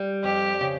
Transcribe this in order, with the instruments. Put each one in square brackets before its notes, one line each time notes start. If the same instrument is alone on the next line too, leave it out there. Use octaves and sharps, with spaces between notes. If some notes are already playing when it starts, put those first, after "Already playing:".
Already playing: [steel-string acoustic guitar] G3
[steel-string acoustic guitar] F2 [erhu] G4
[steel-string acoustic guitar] C#3